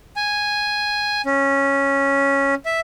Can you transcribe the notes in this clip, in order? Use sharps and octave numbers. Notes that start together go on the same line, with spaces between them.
G#5
C#4
E5